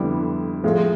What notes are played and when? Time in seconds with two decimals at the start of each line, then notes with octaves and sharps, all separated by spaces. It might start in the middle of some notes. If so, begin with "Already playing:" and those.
Already playing: F2 D3 G3 B3 E4
0.64 A2 F3 G#3